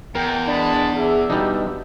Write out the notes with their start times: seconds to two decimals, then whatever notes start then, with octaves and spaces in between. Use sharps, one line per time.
0.15 E2 A#4 G5
0.48 G#3 D4 A5 B5
0.96 G#4 D5 E5
1.30 B2 G3 D4 D#4